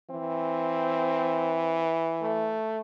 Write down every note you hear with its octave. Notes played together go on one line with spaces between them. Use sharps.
E3 C4
A3